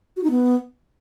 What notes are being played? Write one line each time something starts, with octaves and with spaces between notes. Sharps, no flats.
F#4
D#4
B3